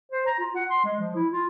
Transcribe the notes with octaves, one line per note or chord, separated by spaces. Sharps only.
C5
A#5
F4
F#5
C6
G#3
F3
E4
F4